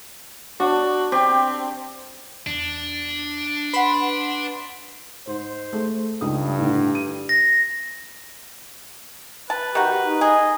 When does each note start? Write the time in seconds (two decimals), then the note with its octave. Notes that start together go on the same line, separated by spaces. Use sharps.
0.60 D4 F#4
1.12 C4 G4
2.46 E2 D4
3.73 B4 F#5 B5 C6 E7
5.27 G#2 C5
5.73 A3 G#4
6.21 C#2 G2 D#4 D#6
6.58 A2 D3
6.95 D#7
7.29 A#6
9.50 B4 A5
9.75 D#3 F#4 G4
10.01 D#4
10.21 G#4 D#5